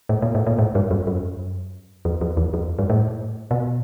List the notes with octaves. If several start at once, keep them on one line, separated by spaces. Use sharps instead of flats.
A2
A#2
A2
A#2
A2
G2
F#2
F#2
F2
F2
E2
F2
G2
A2
B2